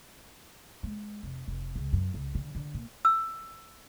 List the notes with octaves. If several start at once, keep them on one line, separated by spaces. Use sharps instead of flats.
G#3
F1
F1
C#2
F#2
C#2
D3
D3
A#2
E6